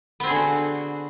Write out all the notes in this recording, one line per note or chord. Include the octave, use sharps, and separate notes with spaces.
D3 B3 C4 F#4 G#4